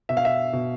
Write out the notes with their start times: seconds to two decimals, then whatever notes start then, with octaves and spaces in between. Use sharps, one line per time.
0.09 B2 E5
0.17 F5
0.25 E5
0.53 B2